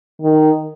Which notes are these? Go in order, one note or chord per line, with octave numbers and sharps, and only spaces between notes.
D#3